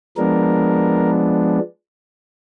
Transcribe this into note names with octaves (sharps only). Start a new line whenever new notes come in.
F3 G#3 B3 D4 A#4